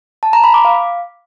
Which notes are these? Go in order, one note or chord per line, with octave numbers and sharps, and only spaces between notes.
A5
A#5
B5
D6
F5